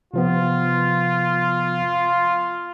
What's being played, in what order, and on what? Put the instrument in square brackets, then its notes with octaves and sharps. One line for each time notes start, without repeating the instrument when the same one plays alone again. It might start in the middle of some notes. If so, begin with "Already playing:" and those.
[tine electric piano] C3 F3 B3 [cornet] F4